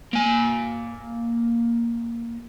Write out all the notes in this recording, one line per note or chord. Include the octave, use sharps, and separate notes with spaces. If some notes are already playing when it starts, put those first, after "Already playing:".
A#3 G#5